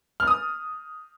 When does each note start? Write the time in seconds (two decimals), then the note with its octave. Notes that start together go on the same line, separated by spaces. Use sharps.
0.20 F6
0.27 D#6